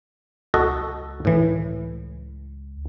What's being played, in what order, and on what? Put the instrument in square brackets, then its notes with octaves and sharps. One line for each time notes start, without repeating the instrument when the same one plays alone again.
[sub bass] C#2 [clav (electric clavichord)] F#4 A4 D#5
[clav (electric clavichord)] A2 E3